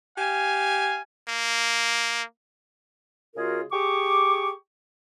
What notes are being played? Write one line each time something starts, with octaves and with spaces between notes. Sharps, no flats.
G4 F5 G#5
A#3
C#3 G#3 F4 F#4 G#4 A#4
G4 G#4 C#6 D6